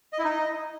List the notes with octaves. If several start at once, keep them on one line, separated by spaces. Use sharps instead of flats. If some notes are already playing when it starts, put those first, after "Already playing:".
D#5
E4
D#4
D#5